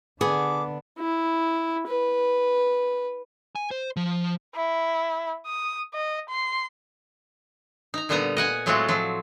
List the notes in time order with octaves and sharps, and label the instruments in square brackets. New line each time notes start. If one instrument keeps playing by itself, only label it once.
[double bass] D3 D4 [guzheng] B3 [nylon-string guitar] G#4 [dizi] D6
[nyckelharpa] E4
B4
[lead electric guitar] G#5
C5
F3
[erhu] E4
D#6
D#5
C6
[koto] D#4 A#5
A#2 D3 G3 B3 D#5 A#5
D#5 F#5 G#5
A2 F#3 G#3 C4 F4 F#4
F3 F#3